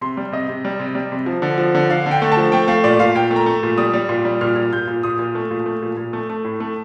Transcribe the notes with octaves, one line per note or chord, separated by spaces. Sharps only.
C3 C6
G3
C3 D#5
C3
G3
C3
G3
C3
F3
D3
F3
D3
D3 F5
D3
G5
A3
A5
F3
A3 G5
A3 F5
A#2 D5
A#2 F5
A#2 G5
A3
A#5
A3
A#2
G3 D#6
G3
A#2
G3
A#2 F6
A#2
A#2 G6
A#2
A#2 D#6
A#2
A3
A#2
A3
A#2
A#2
A3
A3
A2
A3